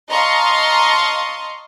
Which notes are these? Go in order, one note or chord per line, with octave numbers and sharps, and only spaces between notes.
D#5 F5 A5 A#5 C6 C#6